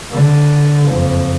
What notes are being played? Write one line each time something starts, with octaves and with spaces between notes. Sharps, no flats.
D3
F#1 F2